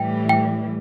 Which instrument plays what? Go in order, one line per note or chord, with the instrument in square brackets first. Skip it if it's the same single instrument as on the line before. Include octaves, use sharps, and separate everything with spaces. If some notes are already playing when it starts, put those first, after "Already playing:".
Already playing: [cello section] A2 E3 G3 [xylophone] G5
[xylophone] G5